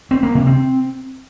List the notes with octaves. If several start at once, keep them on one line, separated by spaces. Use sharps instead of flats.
C4
A#3
C3
C4